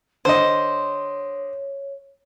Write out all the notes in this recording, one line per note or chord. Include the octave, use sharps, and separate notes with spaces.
D3 C5 C#5 D#5